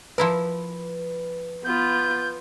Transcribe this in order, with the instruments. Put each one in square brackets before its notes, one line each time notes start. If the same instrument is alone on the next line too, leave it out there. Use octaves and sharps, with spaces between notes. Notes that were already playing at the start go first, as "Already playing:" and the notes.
[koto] F3 E4 A#4 [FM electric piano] B4
[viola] B3 F4 [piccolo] G6